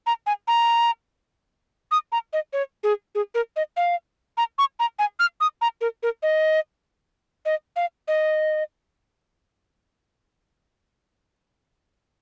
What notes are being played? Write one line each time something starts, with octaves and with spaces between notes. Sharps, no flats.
A#5
G#5
A#5
D#6
A#5
D#5
C#5
G#4
G#4
A#4
D#5
F5
A#5
C#6
A#5
G#5
F6
D#6
A#5
A#4
A#4
D#5
D#5
F5
D#5